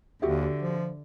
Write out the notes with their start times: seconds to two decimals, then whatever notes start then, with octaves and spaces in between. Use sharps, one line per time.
0.22 D#2 D3 F#4 G4 E5
0.62 F3